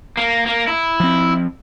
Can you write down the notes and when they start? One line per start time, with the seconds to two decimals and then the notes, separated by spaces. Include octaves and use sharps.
0.17 A#3
0.46 A#3
0.67 E4
1.00 F3 C4